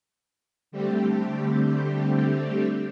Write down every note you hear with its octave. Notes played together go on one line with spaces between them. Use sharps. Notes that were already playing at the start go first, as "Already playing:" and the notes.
D3 G3 A3 C4 G4